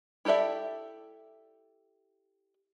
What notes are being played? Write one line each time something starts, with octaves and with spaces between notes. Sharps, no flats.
E4 G4 A4 D5 E5